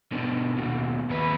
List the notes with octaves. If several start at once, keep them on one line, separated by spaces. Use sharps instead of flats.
B2 D3
D#2 B2
D#2 B4